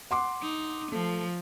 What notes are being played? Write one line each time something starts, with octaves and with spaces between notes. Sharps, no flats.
F#5 C6 D6
D#4
F3 A3